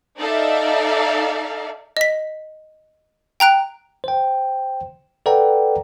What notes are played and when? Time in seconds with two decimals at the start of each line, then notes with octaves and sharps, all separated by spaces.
0.19 D#4 A4 D5 E5 F5
1.97 D#5 B6
3.40 G5 A#5 F#6 D7
4.04 C5 G5
5.26 A4 B4 D5 F#5 G5 A#5